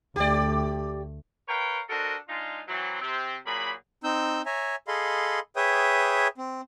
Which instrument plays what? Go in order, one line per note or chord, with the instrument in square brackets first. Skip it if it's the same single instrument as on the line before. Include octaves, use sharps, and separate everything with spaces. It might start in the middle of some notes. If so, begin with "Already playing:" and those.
[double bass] D2 A3 [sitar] G4 D5
[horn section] A#4 B4 C#5 F5 G5
D4 F#4 A4 A#4 C5 D#5
G#3 D4 D#4 F4
E3 F#3 C4
C3 C4
A#2 F#3 A#3 G#4 B5
[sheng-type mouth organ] C4 D#4 E6 G6
C#5 E5 G#5 A#5
G#4 A4 D#5 F5 B5 C6
G#4 B4 C#5 E5 G5 D#6
C4